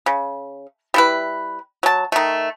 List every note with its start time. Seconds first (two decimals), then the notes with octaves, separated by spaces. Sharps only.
0.06 C#3
0.94 G3 E4 B4
1.83 F#3 A5
2.12 D#3 A3